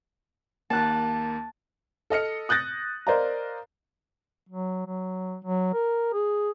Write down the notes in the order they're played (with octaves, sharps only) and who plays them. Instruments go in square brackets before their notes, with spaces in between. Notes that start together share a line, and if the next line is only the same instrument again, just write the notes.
[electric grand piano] D#2 A#3 [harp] A5 F#6
[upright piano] A4 D#5 F6 C#7
D#6 F#6 G6 A6 A#6
A#4 C5 D5 D#5 F5 A#5
[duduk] F#3
F#3
F#3
A#4
G#4